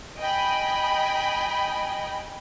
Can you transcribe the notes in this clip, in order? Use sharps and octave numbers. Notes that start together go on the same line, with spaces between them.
D#5 G5 G#5 B5